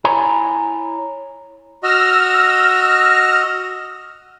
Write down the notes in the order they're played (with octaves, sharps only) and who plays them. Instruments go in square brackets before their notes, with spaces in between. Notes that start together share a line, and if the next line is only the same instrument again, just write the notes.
[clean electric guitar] E4 C#5 G#5 A#5
[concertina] F#4 D#5 [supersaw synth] E6 F6 A#6